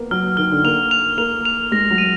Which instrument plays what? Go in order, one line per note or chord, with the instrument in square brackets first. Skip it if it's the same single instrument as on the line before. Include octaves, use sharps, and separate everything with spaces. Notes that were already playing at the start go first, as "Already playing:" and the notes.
Already playing: [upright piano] A#3 B3
[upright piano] F#3 [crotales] F6
[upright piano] D#3 [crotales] F6
[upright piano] D3
[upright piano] A#3 [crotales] F7
[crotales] F7
[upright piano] A#3 [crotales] F7
[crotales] F7
[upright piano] G#3 [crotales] A#6
[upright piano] F#3
[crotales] D#7